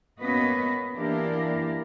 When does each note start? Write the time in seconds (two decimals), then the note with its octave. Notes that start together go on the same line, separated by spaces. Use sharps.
0.20 A#3 B3 C#4 F#4 B4 D#5
0.95 E3 A#3 D4 E4 G4 A#4